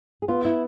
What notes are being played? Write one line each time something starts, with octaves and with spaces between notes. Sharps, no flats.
G#4
B3 F4
E4